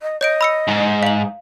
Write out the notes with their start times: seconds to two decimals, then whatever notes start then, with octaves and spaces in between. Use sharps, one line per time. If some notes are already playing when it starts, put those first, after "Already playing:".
0.02 D#5
0.21 C#5 D#5 G6 D7
0.41 B5 E6 C#7
0.68 G#2
1.03 F5 F#7